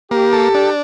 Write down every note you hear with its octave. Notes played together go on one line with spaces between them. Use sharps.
A#3 G4
A4
D4